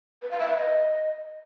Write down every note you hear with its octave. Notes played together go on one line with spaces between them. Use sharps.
B4
F5
E5
B4
D#5